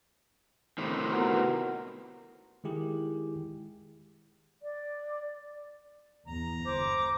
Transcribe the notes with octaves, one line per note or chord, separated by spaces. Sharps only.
A2 C3 D#3
B3 F#4 A#4
D#3 G#3 E4 G4 G#4
D5
E2 A#5
G1 C5 D6